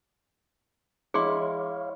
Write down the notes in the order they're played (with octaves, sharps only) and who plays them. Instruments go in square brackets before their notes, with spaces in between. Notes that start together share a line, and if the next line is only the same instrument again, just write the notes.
[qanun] G#3 E4 [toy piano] G#4 C6 [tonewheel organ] C#5 F5